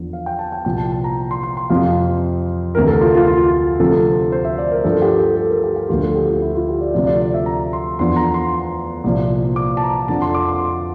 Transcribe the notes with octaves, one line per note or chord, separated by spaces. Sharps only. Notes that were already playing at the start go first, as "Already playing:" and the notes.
Already playing: E2 D3 F3
F5
G5
A5
G5
C2 A#2 F3 G5
A5
A5
A#5
C6
C6
C6
F2 C3 F3 F5
D2 C3 E3 A#4
A4
F4
F4
F4
D2 C3 F3 A4
C5
E5
D5
A#4
G2 D3 F3 A4
G4
A4
A4
A#4
G4
G4
D2 D3 F3 F4
A4
G4
F4
E4
F4
G4
D5
D2 C3 F3 D5
D5
D5
E5
A#5
C6
E2 D3 F3 C6
A#5
C6
C2 A#2 F3
D6
A5
A#5
F2 D3 F3 A5
C6
D6
C6